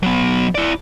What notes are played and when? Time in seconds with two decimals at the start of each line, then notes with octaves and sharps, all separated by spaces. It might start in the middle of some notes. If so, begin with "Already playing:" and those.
0.03 F#3 B3
0.55 E4 D5